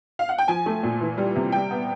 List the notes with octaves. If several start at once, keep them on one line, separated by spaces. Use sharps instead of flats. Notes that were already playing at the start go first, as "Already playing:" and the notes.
F5
F#5
G5
F3 G#5
A3
A#2
E3
G3
C3
G3 G5
B3